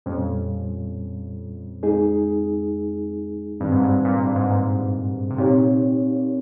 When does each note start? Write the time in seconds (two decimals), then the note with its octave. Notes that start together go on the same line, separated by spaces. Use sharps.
0.06 F2 A#2 G3 C#4
1.83 F2 G#3 D#4 G#4
3.60 G2 D#3 G3 C4
3.72 G#2
3.83 G2
4.05 A#2
4.23 G2
4.36 G#2
4.49 A#2
5.30 C3
5.38 A#2 C4 D#4 G4 C#5